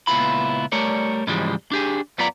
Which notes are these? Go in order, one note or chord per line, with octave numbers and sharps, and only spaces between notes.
C#2 A#2 B3 E4 F4 B5
G3 A3 A#4 C#5 D5
G#2 C#3 E3 F3 G3 G#3
D4 G4 G#4
F#2 B3 F4 B4 D5 A#5